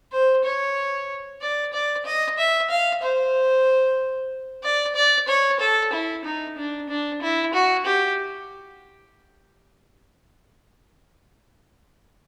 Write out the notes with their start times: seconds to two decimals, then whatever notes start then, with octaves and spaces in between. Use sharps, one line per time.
0.12 C5
0.45 C#5
1.42 D5
1.73 D5
2.06 D#5
2.38 E5
2.70 F5
3.02 C5
4.64 D5
4.96 D5
5.28 C#5
5.60 A4
5.93 E4
6.25 D#4
6.58 D4
6.89 D4
7.22 E4
7.54 F#4
7.86 G4